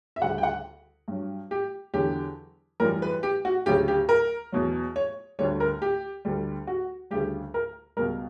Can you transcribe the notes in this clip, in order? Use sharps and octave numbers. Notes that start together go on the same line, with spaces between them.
E5
D2 C#3 G3 F#5
G5
F#5
G2 F#3
G4
E2 D3 F#3 G4
F#2 E3 G3 A#4
B4
G4
F#4
D2 C#3 F#3 G4
G4
A#4
E2 B2 F#3
C#5
D2 D3 G3 C#5
A#4
G4
D2 D3 G3
F#4
D2 C#3 G3 G4
A#4
C#2 B2 G3 A#4